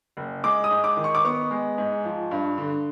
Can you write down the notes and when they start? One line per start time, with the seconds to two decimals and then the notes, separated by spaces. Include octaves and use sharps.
0.17 F#1
0.44 G#3 D6
0.64 D#6
0.71 G#2
0.84 D6
0.97 D#3
1.04 C#6
1.15 D6
1.25 B3 C#6
1.51 G#3
1.78 G#2
2.05 F3
2.31 G2
2.58 D3